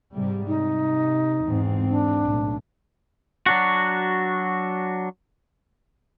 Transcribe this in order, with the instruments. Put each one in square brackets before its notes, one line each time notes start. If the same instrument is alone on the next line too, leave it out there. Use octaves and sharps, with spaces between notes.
[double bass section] G#2 C3 G3
[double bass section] C3 [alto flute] D#4
[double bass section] E2 G#2 C4
[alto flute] D4
[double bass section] B1 A2
[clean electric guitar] F#3 D4 F#4